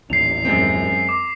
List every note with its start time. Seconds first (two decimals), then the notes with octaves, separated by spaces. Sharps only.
0.10 A1 D#2 A#2 C7 F7
0.45 F#2 G#3 C4
1.09 D6